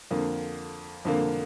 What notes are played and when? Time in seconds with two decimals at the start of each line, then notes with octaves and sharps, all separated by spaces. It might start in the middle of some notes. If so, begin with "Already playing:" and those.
0.11 F2 D3 A#3
1.05 F2 D3 A#3